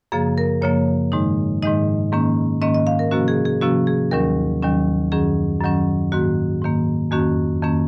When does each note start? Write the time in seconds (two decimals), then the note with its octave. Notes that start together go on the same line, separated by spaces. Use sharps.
0.12 F#2 C#3 F3 A#3 G#4
0.38 A#4
0.62 F#2 C#3 F3 A#3 C#5
1.12 G#2 D#3 G#3 D#4
1.63 G#2 D#3 G#3 D#4 D#5
2.13 G#2 D#3 A#3 C#4
2.62 G#2 D#3 A#3 C#4 D#5
2.74 D#5
2.87 F5
2.99 A#4
3.11 C3 F3 A#3 C#4 F#4
3.28 G#4
3.45 G#4
3.61 C3 F3 A#3 C#4 F#4
3.87 G#4
4.11 D#2 D#3 F#3 C#4 A#4
4.62 D#2 D#3 F#3 C#4
5.12 F#2 D#3 F#3 C#4 G#4
5.61 F#2 D#3 F#3 C#4
6.12 G#2 D#3 A#3 F#4
6.62 G#2 D#3 A#3
7.11 F2 D#3 A#3 C#4 F#4
7.62 F2 D#3 A#3 C#4